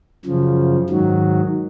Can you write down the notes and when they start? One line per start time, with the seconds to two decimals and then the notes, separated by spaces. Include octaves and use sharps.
0.25 F#2 C#3 F3
0.89 G#2 D#3 F#3